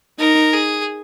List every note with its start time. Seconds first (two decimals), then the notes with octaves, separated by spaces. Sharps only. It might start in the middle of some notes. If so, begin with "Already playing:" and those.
0.19 D#4 A#4
0.53 G#4